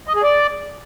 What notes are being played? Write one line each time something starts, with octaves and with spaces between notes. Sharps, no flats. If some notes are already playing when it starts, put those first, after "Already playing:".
D#5
G#4
D5